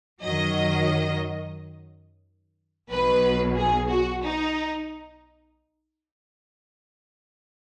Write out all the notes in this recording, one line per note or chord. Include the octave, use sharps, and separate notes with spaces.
F#2 D#3 F#3 D#5
B1 B2 F#3 B4
G#4
F#4
D#4